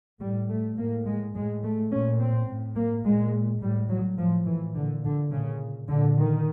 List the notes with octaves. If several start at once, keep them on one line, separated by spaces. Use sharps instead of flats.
A2 G3
A3
A2 A#3
G#3
A2 G#3
A3
A#2 C#4
C4
A2
A#3
A#2 G#3
A2 G3
F#3
A2 F3
E3
A#2 D3
D3
A#2 C#3
A#2 D3
D#3